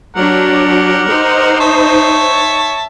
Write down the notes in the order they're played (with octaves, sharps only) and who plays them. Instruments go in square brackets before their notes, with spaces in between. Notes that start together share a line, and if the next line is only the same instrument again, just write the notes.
[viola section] F#3 D4 [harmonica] G4 A#4 F#5
[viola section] D#4 C5
[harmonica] C#5 E5 A5